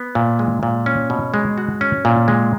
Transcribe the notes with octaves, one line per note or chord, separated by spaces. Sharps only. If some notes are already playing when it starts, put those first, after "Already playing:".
Already playing: B3
A#2
G#3
A#2
C#4
B2
G#3
F#4
C#4
A#2
G#3